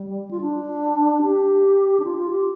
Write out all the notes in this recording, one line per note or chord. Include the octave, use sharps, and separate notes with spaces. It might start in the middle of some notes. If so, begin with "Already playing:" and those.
Already playing: G3
F4
D4
G4
D4
F4
F4
G4